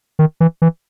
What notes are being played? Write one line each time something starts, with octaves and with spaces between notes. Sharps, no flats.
D#3
E3
E3